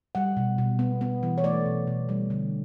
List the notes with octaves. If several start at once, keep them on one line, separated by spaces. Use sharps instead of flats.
G3 F#5
B2
B2
B3
B3
E3
C#5
A3 D5
B2
B2
G3
D3